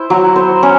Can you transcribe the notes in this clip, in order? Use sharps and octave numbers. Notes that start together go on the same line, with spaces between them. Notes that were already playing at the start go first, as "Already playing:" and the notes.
Already playing: E4 C5
F#3
C5
C#4